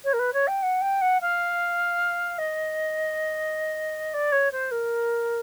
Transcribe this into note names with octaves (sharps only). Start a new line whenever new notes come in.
C#5
A#4
B4
C#5
G5
F#5
G5
F#5
F5
D#5
D5
C#5
C5
A#4